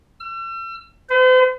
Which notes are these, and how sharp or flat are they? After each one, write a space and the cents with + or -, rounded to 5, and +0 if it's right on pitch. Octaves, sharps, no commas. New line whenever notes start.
E6 +40
C5 -45